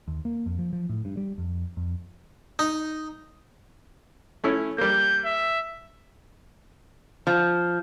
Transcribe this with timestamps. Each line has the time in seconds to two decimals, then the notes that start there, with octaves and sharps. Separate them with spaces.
0.08 D#2
0.25 A#3
0.46 F2
0.59 F3
0.73 F3
0.89 A2
1.05 G2
1.17 G3
1.38 F2
1.77 F2
2.59 D#4
4.44 A3 C#4 E4
4.78 G3 A#3 G6
5.25 E5
7.27 F3